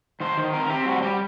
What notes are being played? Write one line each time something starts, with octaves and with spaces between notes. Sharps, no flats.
D#3 C5
D#3
C4 A#4
C4 G4
G3 F#4
G3 G4